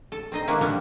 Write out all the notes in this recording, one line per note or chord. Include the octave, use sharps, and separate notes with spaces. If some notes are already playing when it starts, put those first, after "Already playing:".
A4
C4 D#4 D#5
D#3 E3 G#3 A#3 B3 E4
D3 F3 G3 G#3 B3